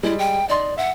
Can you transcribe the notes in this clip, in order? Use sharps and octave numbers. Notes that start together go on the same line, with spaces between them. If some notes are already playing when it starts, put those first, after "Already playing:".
G3 G#3 E4
G5
D#4 D5 D#5 C6
E5 F#5